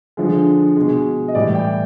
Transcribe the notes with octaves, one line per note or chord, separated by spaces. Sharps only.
D3 F3 G#3
B2 G#3
D#5
A2 E3 G3 D5
G5